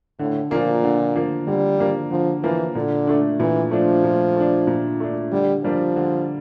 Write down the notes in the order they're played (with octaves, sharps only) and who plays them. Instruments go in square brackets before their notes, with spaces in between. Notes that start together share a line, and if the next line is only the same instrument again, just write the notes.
[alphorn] A2 [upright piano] D3
[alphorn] A#2 [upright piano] F3 A#3
[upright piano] D3
F3 A#3
[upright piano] D3 [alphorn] G3
[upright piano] F3 A#3
[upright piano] D3 [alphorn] F3
[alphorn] E3 [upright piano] F3 A#3
[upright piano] A#2 [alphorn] D3
[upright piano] A3 D4
[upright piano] A#2 [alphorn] E3
[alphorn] F3 [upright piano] A3 D4
[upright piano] A#2
A3 D4
A#2
A3 D4
[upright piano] D3 [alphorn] G3
[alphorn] F3 [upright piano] G3 A#3 D4
[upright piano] D3